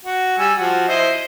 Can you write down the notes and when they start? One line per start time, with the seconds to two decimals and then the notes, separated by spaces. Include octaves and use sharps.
0.05 F#4
0.38 G3 G#5 E6
0.58 F3 F#4
0.88 E4 C5 D#5